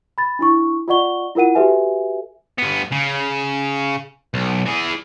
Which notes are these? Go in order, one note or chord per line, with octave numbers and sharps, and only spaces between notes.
B5 A6
D4 E4 C#6
F4 D5 D#5 F#5 C#6 G7
E4 F4 A#4 F#5 D#7
F#4 G4 A4 B4 E5 G#5
G2 B3
C#3
B1
E3 G#4